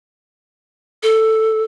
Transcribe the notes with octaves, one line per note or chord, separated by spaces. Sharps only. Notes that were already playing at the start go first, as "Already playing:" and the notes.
A4